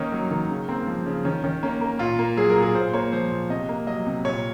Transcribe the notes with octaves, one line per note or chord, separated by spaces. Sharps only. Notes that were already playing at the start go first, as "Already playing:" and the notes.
Already playing: D#3 A#3 C#4 D#4
F#3
D#3
C#3
A#3 C4
F3
C#3
D#3 C#4
D#3 C#4
A#3 C#4
A#3
A#2 F4
A#3
F#3 G#4
A#4
A#2
G#4
A#2 C5
A#3 C#5
F3 C5
A#2
C3 D#5
A#3
F#3 D#5
C3
A#2 C#5